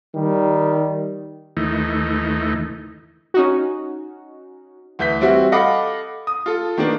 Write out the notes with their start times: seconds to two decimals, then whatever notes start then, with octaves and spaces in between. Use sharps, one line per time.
0.16 D#3 G3
1.57 D#2 E3 A3 D#4
3.34 C#4 D#4 F#4
4.99 D2 E3 G6 B6
5.21 G3 C4 E4 F#4
5.52 A4 D#5 F5 F#5 B5 D6
6.27 D#6
6.46 F4 A4
6.77 D#3 A#3 B3 D4